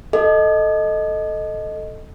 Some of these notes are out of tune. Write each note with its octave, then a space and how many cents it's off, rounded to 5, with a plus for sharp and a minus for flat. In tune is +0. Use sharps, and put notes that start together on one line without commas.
A4 +0 D#5 +0